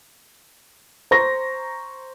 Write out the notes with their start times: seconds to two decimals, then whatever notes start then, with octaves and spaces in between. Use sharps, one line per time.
1.11 C5 A#5 C#6 A#6